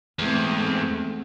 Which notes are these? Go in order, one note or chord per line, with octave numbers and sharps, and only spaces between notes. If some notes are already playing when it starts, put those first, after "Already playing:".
E2 G#2 A3 C4